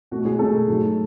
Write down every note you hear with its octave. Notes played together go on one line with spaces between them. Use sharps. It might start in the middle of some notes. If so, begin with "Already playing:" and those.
B2 A3 F#4
F#4
G#3 G#4
B2 A3 A4
G#2 F#3 A3